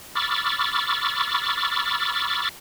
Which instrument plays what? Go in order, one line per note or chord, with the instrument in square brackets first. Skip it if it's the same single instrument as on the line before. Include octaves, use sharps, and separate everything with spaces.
[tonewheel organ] B5 C#6 D6 E6 F6 A6